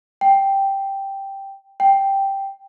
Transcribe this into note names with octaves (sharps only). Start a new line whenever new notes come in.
G5
G5